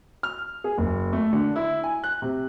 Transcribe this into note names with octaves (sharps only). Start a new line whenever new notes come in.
F6
G#4
F#1
A3
D3
E4
G#5
F#6
C3